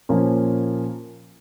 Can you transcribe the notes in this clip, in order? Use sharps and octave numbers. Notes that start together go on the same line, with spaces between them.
A#2 F3 A#3 C#4